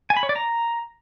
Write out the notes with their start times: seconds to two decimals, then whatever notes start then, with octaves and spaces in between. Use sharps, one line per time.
0.10 G#5
0.17 B5
0.23 C#5
0.29 D5
0.36 A#5